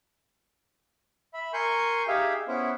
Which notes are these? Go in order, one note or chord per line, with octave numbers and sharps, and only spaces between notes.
E5 B5
A#4 G#5 C6 C#6 G6
D#4 G4 G#4 E5 F5
B3 C#4 E4 C5